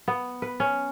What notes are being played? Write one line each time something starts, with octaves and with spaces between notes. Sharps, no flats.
B3
B4
C#4